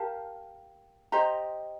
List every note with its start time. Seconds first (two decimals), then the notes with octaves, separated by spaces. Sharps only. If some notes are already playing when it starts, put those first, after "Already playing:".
Already playing: G4 A#4 F5 A5
1.12 G4 C5 D#5 A#5